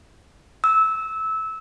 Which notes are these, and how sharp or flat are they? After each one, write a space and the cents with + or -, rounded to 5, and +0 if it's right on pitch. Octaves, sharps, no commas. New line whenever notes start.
E6 -20